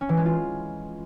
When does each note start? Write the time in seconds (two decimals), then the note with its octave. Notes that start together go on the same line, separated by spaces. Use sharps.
0.01 C#4
0.09 E3
0.17 G#3
0.25 F4